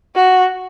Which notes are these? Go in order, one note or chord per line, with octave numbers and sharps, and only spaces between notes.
F#4